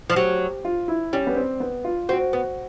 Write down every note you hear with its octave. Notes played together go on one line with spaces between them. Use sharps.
F3
F#3 G4
F4
E4
G3 C#4
B3
C4
B3
F4
C4 F#4
B3